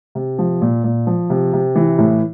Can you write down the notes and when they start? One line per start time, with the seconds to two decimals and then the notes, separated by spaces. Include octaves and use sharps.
0.15 C3
0.39 F3
0.62 A#2
0.84 A#2
1.07 F3
1.30 C3
1.53 C3
1.75 E3
1.98 A2